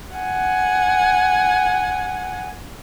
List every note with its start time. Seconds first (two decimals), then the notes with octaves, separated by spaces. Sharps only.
0.16 F#5 G#5